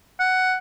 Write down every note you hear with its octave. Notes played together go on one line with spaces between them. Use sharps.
F#5